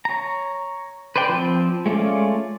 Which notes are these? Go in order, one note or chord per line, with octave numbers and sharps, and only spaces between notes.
C#5 A#5
B4 C5 D5 G5
F3 C4
G#3 A3 C#4 F4 D5